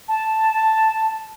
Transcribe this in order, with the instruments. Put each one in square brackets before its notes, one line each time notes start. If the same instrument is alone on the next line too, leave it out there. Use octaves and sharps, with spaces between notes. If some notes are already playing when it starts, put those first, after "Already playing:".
[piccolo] A5